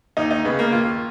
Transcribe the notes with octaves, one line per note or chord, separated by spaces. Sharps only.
D#2 D#4
D#4
C#3 B3
A#3
D#2 F4